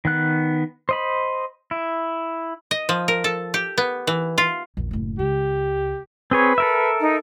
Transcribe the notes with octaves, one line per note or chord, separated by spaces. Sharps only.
D#3 B3 F#6
C5 D#5 B5
E4
D#5
F3
A#4
A4
G4
B3
E3
F4
A#1 E2
F#1 A2
C#2 G4
C4 G#4 B4 C#5
A4 A#4 E5
D#4